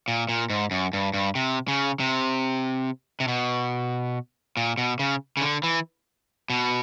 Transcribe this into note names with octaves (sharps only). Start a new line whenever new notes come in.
A#2
A#2
G#2
F#2
G2
G2
C3
C#3
C3
C3
B2
A#2
B2
C#3
C#3
D3
E3
B2